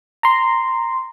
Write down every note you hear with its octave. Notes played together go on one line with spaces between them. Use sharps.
A#5 C6